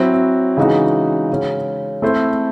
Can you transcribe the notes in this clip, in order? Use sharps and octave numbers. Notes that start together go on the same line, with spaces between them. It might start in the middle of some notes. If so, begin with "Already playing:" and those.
Already playing: F#3 C4 E4
C#3 E3 G#3 D#4 F#4
C#3 G#3 C#4
A3 C4 E4 A4 C5